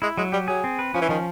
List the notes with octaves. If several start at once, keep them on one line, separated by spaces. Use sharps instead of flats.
G#3 E4
F#3 G#3
G3 G4
F#3 G#4
C4
B4
F3 C#4
E3
D#3 F3